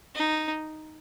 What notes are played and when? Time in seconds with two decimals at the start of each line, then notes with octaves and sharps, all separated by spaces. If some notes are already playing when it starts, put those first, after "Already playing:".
0.15 D#4